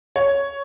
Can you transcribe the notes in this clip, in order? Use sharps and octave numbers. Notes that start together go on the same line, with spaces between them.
C#5